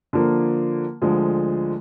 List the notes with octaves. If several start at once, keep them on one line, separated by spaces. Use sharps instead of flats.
D3 F3 A#3
D2 D3 F3 G#3